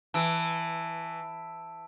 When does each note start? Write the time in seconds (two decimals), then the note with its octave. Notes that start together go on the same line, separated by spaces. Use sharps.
0.14 E3 A5 E6 D7